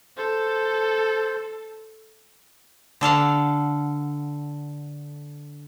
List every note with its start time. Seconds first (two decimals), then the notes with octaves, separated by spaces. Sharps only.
0.17 A4 C5
3.01 D3 A4 F5 F#5